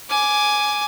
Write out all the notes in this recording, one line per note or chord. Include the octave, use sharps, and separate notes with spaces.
G#5 D6